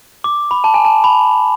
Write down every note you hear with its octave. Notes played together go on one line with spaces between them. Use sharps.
D6
B5
A5
G#5
A5
B5